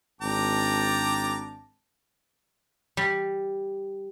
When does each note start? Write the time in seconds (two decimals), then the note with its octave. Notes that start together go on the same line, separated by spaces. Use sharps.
0.22 G#1 D4 G5 A5 A#5 D6
2.97 G3